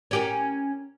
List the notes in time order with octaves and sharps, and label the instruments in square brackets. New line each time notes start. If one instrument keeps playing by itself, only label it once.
[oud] C#4 G4 A#4